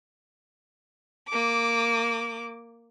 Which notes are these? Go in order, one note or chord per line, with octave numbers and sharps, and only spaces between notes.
A#3 D6